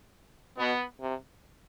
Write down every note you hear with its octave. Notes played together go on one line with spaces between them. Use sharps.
B2 B3
C3